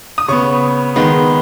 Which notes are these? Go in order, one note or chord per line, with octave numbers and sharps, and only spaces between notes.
D#6
C#3 B3 C#6
D#3 G#3 B3